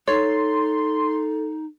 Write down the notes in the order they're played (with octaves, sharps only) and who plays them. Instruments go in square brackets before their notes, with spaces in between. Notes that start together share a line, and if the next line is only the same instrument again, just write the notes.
[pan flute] D#4 [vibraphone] A4 [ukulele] C#5 [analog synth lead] C6